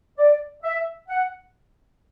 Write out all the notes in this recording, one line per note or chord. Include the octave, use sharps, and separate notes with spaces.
D5
E5
F#5